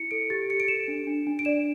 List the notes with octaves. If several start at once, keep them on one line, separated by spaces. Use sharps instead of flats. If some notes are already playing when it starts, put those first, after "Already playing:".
Already playing: E4 C#7
A4 D7
G4 A6
G4 C#7
D7
A4 E7
D4
D4
D4
D7
D5 E7